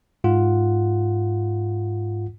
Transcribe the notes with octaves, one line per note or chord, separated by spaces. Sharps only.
G#2 F4 F#5